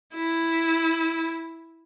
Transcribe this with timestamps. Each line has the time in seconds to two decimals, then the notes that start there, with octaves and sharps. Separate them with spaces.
0.15 E4